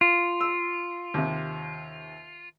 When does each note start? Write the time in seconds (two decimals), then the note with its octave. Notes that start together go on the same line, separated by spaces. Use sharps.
0.01 F4
0.41 E6
1.14 D#2 C3